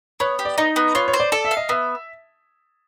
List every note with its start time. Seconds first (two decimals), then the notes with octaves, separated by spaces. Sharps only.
0.20 B3 C#5
0.39 G4
0.45 D5
0.58 D#4 D#5
0.76 B3
0.95 F4 C#5
1.08 C#5
1.14 C5
1.20 D5
1.32 A4 D5
1.45 E5
1.51 F5
1.57 D#5
1.69 B3 E5